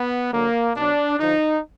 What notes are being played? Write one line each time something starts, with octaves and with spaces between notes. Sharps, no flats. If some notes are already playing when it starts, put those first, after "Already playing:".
Already playing: B3
D3 F#3 A#3
B2 F#3 D4
D3 F3 D#4